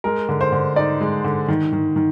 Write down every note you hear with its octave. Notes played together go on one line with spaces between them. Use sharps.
G#3 A#4
D3
C5
D3
D#4 D5
G#3
D3
D#3
D#3
D#3